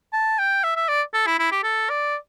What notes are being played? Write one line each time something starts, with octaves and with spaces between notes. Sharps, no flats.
A5
G5
E5
E5
D5
A4
E4
E4
G4
A4
D5